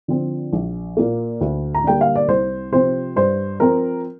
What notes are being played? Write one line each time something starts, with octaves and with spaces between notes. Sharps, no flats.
D3 F3 C4
A#1
A#2 A#3
D2
A#5
D3 G3 A#3 G5
F5
D5
C2 C5
C3 F3 C4 C5
G2 C5
F3 C4 A#4